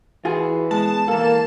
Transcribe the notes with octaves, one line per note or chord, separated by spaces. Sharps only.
E3 F4 F#4 G#4
G#3 B3 A5
E3 A#3 A4